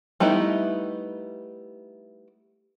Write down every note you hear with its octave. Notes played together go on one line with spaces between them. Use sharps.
G3 A3 B3 D#4 E4